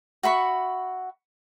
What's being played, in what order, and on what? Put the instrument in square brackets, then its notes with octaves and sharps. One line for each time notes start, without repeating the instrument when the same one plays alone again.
[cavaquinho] F#4 E5 B5 C#6